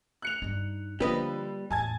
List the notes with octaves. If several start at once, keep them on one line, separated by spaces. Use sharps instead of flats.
F#6 C#7 F7
G2 D#4
D3 F3 G3 A#3 B4 D#5
E2 A2 G#5 A5 G#6